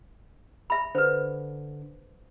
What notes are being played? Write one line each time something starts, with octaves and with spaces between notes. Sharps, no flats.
E5 B5
D3 B4 C5